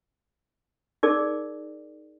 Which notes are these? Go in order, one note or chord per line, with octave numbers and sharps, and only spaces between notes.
D#4 G#4 A#4 D5